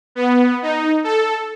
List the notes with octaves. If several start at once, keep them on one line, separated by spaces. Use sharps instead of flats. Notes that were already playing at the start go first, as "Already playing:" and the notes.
B3
D#4
A4